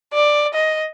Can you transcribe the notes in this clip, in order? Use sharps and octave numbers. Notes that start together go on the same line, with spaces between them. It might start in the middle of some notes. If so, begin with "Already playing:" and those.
D5
D#5